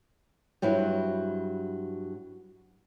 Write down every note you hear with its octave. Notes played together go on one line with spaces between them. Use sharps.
G2 F#3 C4 E4 F4